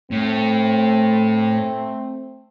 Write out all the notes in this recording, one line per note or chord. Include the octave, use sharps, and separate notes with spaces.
A2 A3 C4